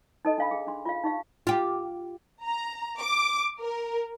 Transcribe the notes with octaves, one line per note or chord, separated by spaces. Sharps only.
D#4 A4 D#5
D4 F5 B5
G#4
D4 C6
F4 F5
D#4 G4 F5
F4 G4
A#5
D6
A#4